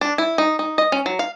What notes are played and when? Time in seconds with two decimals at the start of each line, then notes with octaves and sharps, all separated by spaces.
0.01 D4
0.18 E4
0.38 D#4
0.59 D#4
0.78 D#5
0.92 C#4
1.06 F#3
1.19 F5